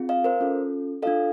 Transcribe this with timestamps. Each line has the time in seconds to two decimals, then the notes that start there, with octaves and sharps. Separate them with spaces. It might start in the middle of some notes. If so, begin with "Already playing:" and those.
Already playing: C4 F4 G#4
0.09 D#5 F5
0.24 A#4 C5
0.41 C#4 F4 A4
1.02 D4 F4 A4 D#5 F5